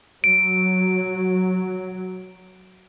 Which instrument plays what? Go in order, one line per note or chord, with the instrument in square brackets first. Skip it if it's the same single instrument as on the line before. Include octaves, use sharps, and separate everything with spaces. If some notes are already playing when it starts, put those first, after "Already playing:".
[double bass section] F#3 [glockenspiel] D7